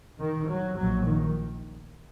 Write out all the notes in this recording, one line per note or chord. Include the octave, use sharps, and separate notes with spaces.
D#3
F#3
A#1 A#2 F#3
D#3